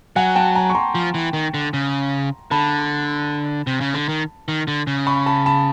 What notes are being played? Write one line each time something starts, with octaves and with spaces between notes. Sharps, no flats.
F#3 F#5 G#5
G5 A5
G#5 A#5
C#6
A#5 C6
F3
E3
D#3
D3
C#3
D3 A5 B5
C3
C#3
D3
D#3
D#3
D3
C#3
B5 C#6
A5 B5
A5 B5